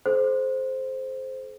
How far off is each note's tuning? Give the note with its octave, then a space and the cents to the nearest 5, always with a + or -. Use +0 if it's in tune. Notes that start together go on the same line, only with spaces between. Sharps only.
A4 -45 C5 +0